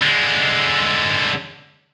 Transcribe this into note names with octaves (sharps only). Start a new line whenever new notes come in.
D3 G#3